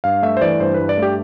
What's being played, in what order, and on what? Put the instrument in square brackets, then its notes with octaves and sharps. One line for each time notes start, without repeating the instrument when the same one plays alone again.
[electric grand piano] G2 F5
A3 E5
C5
E3 D5
G2 C5
B4
G2
D5
A3
G4